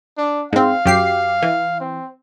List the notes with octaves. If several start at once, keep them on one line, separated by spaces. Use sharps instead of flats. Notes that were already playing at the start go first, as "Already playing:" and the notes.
D4
G#2 C4 F5
F#2 G4 C7
E3
C4